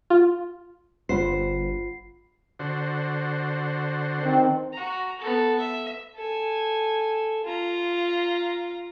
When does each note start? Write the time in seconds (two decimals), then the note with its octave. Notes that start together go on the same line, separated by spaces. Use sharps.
0.10 F4
1.09 G1 F4 C5 F#5 B5 C7
2.59 D3 F#4 C5
4.19 D#3 C4
4.73 F#4 A#5
5.19 B3 A4
5.59 E5
6.15 A4 G#5
7.44 F4 A#5